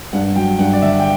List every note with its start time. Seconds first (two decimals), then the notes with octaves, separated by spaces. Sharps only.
0.13 G2 F#5
0.36 F#3 G5
0.59 G2 F#5
0.73 D5
0.82 D3 E5
0.99 G5